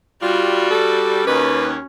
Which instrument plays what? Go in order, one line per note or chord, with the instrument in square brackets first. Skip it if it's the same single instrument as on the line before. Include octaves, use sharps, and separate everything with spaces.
[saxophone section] G3 [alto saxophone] F4 [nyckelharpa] F#4
[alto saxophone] A4
[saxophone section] D#2 [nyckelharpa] C#4 [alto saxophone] B4